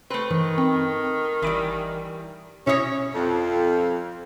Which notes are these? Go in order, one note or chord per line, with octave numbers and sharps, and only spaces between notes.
A3 C4 B4
G2 D#3 E3
C4
G#1 E3 G3 B5 D7
B2 C#4 E4 C#5 D#6 A#6
F2